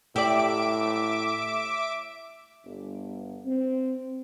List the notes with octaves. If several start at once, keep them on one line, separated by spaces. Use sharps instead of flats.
A2 G4 D5 E5 D6 D7
G1
C4